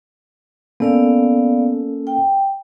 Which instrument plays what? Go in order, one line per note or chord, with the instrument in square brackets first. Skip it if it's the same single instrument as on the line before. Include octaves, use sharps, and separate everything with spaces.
[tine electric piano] A#3 C#4 A4 [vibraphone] B3 D5 F5
[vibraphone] G5